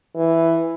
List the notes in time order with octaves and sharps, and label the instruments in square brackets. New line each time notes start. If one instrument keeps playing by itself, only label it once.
[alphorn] E3